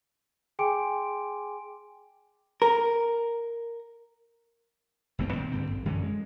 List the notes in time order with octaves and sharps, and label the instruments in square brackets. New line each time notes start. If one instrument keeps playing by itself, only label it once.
[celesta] G#4 G5 G#5 C6 D6 D7
[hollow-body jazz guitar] A#4
[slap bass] F#1 B1 A3 C4
A#2 D#3 C4
G2 D3 C4
A#1
F#2 D3 E3 C#4
G#3